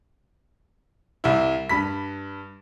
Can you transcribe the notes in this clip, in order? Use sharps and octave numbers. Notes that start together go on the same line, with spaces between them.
C2 E4
G2 B5 B6